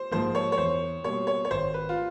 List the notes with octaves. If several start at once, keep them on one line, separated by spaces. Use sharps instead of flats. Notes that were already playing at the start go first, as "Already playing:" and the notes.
Already playing: C5
G#2 F3 A#3 C5
C#5
C#5
E2 C5
B2 G3 A#3 C#5
C#5
C#5
G#1 C5
B4
F4